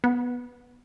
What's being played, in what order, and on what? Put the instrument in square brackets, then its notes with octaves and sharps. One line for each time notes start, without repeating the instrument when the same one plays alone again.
[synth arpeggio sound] B3